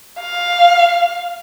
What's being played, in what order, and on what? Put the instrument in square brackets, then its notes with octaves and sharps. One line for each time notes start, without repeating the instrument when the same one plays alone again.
[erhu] F5